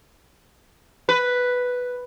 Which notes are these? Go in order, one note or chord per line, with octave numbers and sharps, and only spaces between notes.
B4